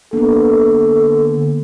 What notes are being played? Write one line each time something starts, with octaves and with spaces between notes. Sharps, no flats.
D3 A#3 B3 A4